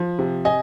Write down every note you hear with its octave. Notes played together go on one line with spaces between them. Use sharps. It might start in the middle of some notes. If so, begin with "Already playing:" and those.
Already playing: F3
C3
D#5 G#5